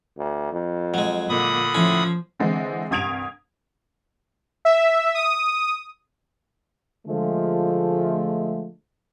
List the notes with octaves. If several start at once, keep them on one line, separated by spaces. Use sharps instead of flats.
D2
F2
F#3 G#3
A#2 D3 B5 D#6
A2 F3 C#4
D3 E3 G#3 C4 D4
C2 G2 D#6 G#6 D7 F7
E5
D#6
D3 F3 G#3 A3